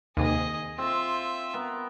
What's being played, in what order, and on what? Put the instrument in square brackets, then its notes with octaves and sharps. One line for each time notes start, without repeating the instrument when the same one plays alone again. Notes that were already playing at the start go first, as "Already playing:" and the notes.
[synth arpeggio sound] D#2 C3 [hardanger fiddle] G#4 D#5
[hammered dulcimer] C4 [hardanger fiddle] F4 E5
[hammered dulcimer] B3 A#4